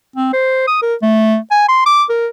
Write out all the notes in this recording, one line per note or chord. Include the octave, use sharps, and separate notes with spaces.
C4
C5
D#6
A#4
A3
G#5
C6
D6
A#4